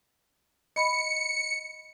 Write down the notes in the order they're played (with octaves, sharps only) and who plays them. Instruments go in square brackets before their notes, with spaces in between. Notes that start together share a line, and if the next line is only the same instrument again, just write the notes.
[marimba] D#5 B5 [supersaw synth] C#7